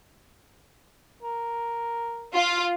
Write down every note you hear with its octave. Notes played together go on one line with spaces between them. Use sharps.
A#4
F4